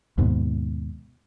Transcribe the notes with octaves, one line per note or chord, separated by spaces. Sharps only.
D#2 G#2 B2